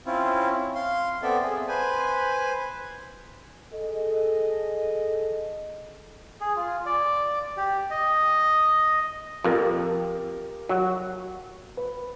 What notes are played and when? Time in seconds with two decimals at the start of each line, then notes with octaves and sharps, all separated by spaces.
0.06 C4 C#4 E4 F4
0.75 F5 C6
1.23 B3 C4 A4 D5 E5
1.42 G#4
1.68 B4 C5 G#5
3.73 G#4 A4 D#5
6.41 G#4
6.56 F4
6.86 D5
7.57 G4
7.90 D#5
9.44 F2 G4 A#4 F5
10.69 F#3
11.77 B4